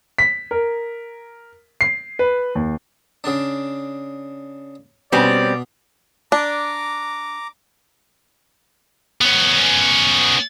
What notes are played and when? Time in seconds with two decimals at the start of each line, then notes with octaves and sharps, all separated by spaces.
0.19 B6
0.51 A#4
1.81 C7
2.19 B4
2.55 D#2
3.24 C#3 D4
5.13 B2 G3 C4 C#4 D5
6.32 D4 A#5 D6
9.21 B3 C#4